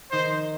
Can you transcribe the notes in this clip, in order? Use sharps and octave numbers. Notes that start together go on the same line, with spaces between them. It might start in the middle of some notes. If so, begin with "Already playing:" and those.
D#3 D#4 C5